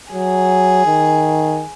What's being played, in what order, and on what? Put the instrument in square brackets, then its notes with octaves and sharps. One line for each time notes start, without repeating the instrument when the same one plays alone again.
[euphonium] F#3 [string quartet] G#4
[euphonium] D#3